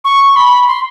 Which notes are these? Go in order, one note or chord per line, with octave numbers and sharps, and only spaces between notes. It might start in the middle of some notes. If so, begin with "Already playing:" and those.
C#6
B5
C6